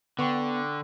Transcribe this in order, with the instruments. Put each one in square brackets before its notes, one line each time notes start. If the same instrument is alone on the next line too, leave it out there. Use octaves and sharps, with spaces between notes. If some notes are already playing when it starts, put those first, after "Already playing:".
[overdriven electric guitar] D3 [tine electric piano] B3 [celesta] G5 C#6 D6